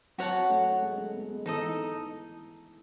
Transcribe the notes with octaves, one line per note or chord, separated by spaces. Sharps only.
F#3 F#4 C#5 F#5 A5
A3
G#3
A3
B3
G#3
E3 D#4 A4 D#5